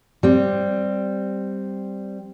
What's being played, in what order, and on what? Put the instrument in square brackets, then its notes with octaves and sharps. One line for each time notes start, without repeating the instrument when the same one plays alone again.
[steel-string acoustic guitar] G3 C4